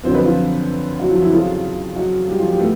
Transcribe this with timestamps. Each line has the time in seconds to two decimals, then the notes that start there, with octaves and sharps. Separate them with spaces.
0.03 F#2 D3 F3 C4 C5
0.14 B3 B4
0.25 F3 F4
1.00 F#3 F#4
1.10 F3 F4
1.22 E3 E4
1.32 F2 C#3 F3 F#3 F4
1.96 F#3 F#4
2.28 G3 G4
2.38 F3 F4
2.50 G3 G4
2.60 A3 B3